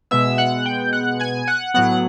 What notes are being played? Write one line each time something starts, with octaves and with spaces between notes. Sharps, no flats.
B2 G#3 B3 E5 E6
F#5 F#6
G5 G6
F#5 F#6
G#5 G#6
F#5 F#6
A2 F#3 B3 F#5 F#6